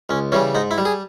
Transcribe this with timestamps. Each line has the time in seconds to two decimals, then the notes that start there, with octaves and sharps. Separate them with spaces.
0.09 C#2 C#4
0.32 C#3 E3 G3 C#4
0.55 G#2 D#4
0.71 E4
0.78 G3
0.85 G#4